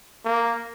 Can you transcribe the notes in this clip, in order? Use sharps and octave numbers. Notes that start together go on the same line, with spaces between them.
A#3